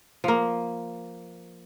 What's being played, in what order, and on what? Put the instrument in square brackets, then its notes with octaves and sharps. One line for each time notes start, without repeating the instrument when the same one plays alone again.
[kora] F3 A#3